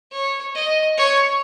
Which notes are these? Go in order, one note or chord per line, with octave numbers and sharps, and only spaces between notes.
C#5
D#5
C#5